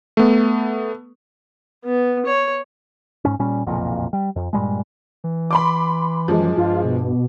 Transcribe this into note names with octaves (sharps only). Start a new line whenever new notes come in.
A3 B3
B3
C#5
G#2 C#4
A#2 G3 C#4
F#1 B1 F2 A#2
G3
F2
G2 A#2 G3 G#3
E3
B5 C6 D6
F#2 F3 G#3
G2 F4
B2